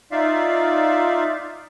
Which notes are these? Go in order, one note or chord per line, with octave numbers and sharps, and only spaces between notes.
D#4 F4 D5 E5 F5